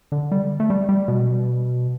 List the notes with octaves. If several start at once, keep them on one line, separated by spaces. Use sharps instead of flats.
D3
G3
A3
G3
G3
B2